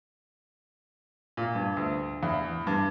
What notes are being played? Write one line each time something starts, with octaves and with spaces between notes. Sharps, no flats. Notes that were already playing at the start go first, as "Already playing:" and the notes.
A#2
G2
D2
E2
G2